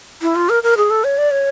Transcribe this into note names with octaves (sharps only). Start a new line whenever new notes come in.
E4
F4
A#4
A#4
G#4
A4
C#5
D5
C#5